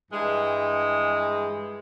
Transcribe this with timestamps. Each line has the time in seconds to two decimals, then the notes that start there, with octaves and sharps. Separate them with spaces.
0.11 G2 E3 G#3